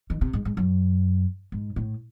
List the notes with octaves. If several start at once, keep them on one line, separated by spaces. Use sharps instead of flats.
D#3
C3
G#2
G#2
F#2
G#2
A2